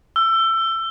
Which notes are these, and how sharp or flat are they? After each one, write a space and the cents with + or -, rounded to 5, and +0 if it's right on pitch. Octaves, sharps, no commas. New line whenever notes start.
E6 +20